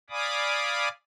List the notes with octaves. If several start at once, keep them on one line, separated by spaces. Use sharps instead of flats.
D5 F5 G#5 B5 D6 D#6